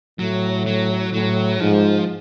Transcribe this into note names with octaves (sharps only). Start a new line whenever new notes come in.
A2 F#3
F#3
A2 F#3
G#2 F3